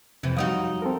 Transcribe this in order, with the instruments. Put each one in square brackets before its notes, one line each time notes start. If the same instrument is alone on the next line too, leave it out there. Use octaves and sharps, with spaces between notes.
[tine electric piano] F2 [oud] C3 E3
[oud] F#2 D#4 F#4 [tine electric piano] F3 G3 [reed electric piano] F5 D#6
[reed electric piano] C4 A4 A#4